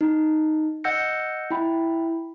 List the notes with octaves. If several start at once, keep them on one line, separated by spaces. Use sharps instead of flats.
D#4
D#5 F#5 E6 G6 A#6 C#7
E4 G5 B5